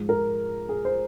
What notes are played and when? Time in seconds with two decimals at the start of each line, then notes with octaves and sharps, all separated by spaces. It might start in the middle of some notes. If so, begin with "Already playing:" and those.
Already playing: G#2 F3 G#3
0.09 A#4
0.69 G#4
0.85 C5